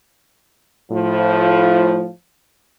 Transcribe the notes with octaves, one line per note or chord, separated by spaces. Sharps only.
A2 F3